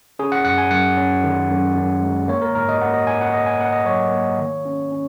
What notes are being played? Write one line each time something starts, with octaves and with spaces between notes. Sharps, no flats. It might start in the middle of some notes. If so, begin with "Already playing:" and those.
C#4 G#4
F#5
F#2 F#5
G#5
F#2 F#5
C#4
D#3
F#2
F#2
G#3
A#3 C#5
A#4
G#2 A#4
D#5
A#3 F#5
D#5
G#2 G#5
F#5
A#3 D#5
G#5
A#3 F#5
D#5
F#3 C#5
A#3
D#3
C#4
C#4